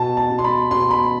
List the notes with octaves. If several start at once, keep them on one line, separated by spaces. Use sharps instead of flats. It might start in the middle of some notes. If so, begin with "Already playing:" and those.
Already playing: B2 A5
A5
B2
C6
B5
B2 C6
B5